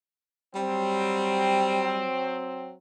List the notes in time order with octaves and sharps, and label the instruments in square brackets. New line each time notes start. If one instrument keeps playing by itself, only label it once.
[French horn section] F#3 C4 [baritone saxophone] G3